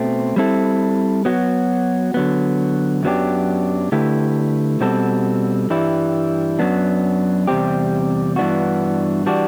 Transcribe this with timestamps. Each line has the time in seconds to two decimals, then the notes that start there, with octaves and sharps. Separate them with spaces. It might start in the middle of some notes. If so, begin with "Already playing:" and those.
Already playing: B2 A3 C4
0.36 G3 C4 E4 A4
1.25 F#3 B3 F#4
2.14 D3 F#3 B3
3.03 F#2 F#3 B3 D4 G4
3.92 D3 A3 E4 G4 B4
4.81 B2 G3 C4 F#4 A4
5.70 G2 E3 G3 E4
6.59 F#2 F#3 B3 D4
7.47 E2 C3 G3 C4 G4
8.36 G2 E3 B3 D4 F#4
9.26 E3 G3 D4 F#4